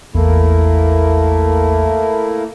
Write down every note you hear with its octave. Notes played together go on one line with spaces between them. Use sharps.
A1 E2 A3 A#3 E4